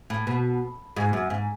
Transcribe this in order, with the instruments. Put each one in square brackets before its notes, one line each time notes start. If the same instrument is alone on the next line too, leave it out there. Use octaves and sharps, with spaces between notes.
[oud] A2
B2
G#2
F#2
G#2